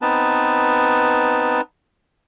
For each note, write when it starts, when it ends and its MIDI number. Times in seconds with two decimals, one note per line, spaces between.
0.02 1.61 59
0.02 1.61 60
0.02 1.61 63
0.02 1.61 71
0.02 1.61 81